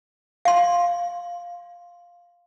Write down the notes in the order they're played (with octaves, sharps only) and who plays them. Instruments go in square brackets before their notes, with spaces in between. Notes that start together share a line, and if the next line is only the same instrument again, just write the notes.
[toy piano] F5 C6